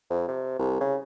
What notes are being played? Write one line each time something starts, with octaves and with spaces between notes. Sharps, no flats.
F2
C3
C2
C#3